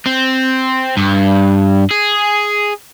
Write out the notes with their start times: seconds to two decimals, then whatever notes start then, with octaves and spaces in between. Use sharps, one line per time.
0.06 C4
0.97 G2
1.91 G#4